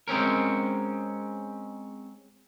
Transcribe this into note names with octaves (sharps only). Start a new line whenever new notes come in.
G#3 C4 C#4 A#4